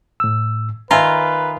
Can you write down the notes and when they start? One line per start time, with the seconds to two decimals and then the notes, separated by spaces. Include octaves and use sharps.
0.20 A2 E6
0.91 D#3 F4 B4 E5 G#5 A#5